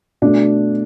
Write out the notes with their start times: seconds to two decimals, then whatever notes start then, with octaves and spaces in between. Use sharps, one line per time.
0.22 B2 A3 D4